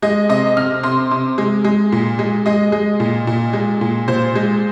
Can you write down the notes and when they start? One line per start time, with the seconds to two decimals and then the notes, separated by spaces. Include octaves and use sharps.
0.02 G#3 D#5
0.29 C3 D#5
0.57 C3 F6
0.83 C3 C6
1.11 C3
1.38 G#3
1.64 G#3
1.92 A#2
2.19 G#3
2.46 G#3 D#5
2.72 G#3
3.00 A#2
3.27 A#2
3.53 G#3
3.81 A#2
4.08 A#2 C5
4.35 G#3